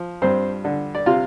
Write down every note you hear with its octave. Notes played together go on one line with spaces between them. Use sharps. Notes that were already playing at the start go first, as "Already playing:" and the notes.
Already playing: F3
G2 C4 C5
D3
D5
C3 F4 F5